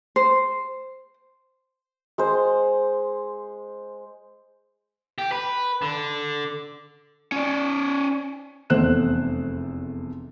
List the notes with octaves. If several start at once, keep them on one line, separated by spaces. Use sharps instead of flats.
C5
G#3 C5
G4
B4
D3
C#4 D5
F1 E2 A3 C5 F#6 E7